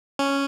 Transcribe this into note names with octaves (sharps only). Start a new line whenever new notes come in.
C#4